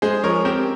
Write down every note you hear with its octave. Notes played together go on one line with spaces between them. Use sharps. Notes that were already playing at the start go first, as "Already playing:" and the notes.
G#3 G#4 C5
F3 A#4 C#5
C4 G4 A#4